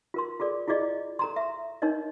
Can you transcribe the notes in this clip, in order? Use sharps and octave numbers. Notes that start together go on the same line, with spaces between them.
F4 A#4 C6
F4 G#4 A4 D5
E4 F4 G#4 D5 D#5
A4 A#5 C6
E5
D4 D#4 A#4 C#5 D#5